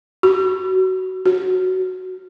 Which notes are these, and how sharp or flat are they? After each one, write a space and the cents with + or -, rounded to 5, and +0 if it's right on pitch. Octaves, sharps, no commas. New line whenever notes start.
F#4 +20
F#4 +5